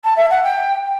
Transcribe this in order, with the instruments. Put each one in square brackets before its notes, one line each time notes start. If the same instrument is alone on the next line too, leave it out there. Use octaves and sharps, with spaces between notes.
[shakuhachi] A5
E5
F#5
G5
G5